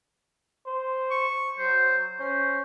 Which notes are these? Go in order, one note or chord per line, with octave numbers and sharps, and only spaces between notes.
C5
C#6
F#3 C5
C#4 C5